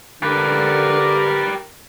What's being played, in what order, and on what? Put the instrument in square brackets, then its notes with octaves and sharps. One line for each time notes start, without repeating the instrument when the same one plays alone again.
[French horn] D3 [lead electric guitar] G4 B4 [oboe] A#4